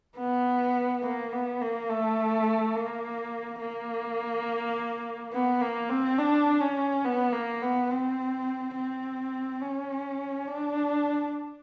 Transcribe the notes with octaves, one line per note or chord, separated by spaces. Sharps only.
B3
A#3
B3
A#3
A3
A#3
A#3
B3
A#3
C4
D4
C#4
B3
A#3
B3
C4
C4
C#4
D4